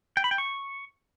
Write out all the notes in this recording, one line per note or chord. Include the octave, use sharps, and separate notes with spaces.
G5
B5
G5
C#6